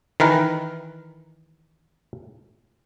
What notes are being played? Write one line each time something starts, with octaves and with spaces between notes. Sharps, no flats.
D#3 E3 A#4 B4